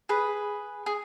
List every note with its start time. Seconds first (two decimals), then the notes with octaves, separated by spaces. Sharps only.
0.09 G#4 B4
0.86 G#4